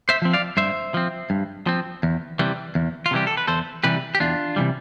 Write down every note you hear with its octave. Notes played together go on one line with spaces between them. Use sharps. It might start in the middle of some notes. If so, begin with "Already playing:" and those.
C5 E5
F3 C4
D5 F5
G2 C5 E5
F3 C4
G2
F3 C4
E2
C3 E3 G3
E2
F4
C3 E3 G3 G4
A4
B4
E2 A4 C5
C3 E3 G3 G4 B4
G4
E2 D4 F4
C3 E3 G3